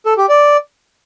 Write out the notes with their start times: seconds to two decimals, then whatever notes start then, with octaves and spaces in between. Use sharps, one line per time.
0.06 A4
0.17 G4
0.29 D5